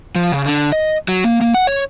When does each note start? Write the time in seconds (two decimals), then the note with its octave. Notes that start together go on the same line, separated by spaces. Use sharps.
0.15 F3
0.32 C#3
0.46 D3
0.72 D#5
1.08 F#3
1.24 A#3
1.41 A#3
1.54 F#5
1.67 C#5